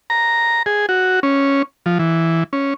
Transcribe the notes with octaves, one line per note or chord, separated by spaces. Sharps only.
A#5
G#4
F#4
C#4
F3
E3
C#4